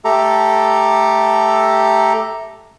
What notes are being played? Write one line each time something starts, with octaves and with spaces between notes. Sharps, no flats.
A3 G4 A4 A#5